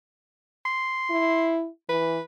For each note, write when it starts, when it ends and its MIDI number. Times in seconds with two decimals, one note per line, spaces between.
0.65 1.52 84
1.10 1.68 64
1.89 2.18 52
1.89 2.22 71